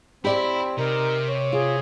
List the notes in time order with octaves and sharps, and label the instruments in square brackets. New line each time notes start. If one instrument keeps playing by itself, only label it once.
[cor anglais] C4 [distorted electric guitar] E4 [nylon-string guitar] G4 D5
[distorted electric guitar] C3 [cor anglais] D#4 [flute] A#4
[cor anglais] C#5
[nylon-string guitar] F4 [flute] G#4